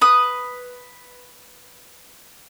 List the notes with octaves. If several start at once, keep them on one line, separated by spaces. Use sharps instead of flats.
B4 D#6